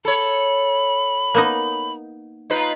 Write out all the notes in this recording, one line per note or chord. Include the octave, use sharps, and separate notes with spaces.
A4 C#5 B5
A#3 B3 D#4
D#4 F4 B4